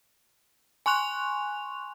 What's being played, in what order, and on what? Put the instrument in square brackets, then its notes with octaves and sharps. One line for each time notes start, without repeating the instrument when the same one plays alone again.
[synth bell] G#5 C6 C#6 F#6 F7